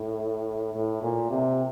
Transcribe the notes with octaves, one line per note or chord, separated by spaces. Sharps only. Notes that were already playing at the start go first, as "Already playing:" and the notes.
Already playing: A2
A2
A#2
C3